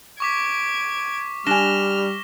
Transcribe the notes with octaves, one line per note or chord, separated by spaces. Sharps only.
C#6 D6 G#6 B6 D7
G3 D4 G#5 F6 A#6 E7 G7